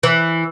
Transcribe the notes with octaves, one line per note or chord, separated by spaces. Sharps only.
E3